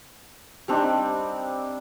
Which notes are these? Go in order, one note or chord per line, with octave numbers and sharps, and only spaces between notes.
G3 C4 D4 D#4